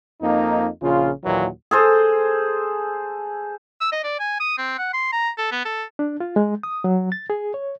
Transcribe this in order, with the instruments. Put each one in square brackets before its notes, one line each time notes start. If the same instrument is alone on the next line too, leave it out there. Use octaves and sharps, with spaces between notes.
[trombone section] F2 A#3 D#4
A#1 C#3 F4
D#2 A#2 E3 F#3
[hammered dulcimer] G#4 A4 C5
[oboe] E6
D#5
D5
G#5
D#6
C4
F#5
C6
A#5
A4
B3
A4
[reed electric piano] D4
F4
G#3
D#6
F#3
A6
G#4
C#5